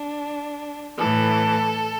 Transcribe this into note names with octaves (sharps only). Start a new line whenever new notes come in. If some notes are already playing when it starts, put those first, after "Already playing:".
Already playing: D4
A2 E3 A4